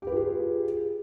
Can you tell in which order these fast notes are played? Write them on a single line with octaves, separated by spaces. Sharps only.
G4 B4 F4 G#4